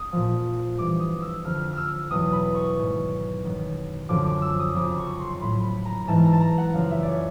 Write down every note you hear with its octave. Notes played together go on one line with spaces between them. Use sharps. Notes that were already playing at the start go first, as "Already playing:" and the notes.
Already playing: D#6
A#2 F3
G2 E3 D6
D#6
E6
F2 D3 F3 F6
E6 F6
E2 B2 F#3 D#6
B5
C#6
G#2 D#3 F#3
F#2 D#3 F#3
F#2 D3 F3 D6
D6
E6
D#6
F2 C#3 F3 D6
C#6
C6
C6
A2 F#3 B5
B5
A#5
G#2 E3 A5
A#5
A5
A#5
F#5
F#2 C#3 F3 F5
E5
C#5 D5